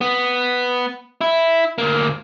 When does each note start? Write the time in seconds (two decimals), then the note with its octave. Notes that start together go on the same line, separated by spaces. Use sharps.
0.01 B3
1.21 E4
1.78 D2 A#3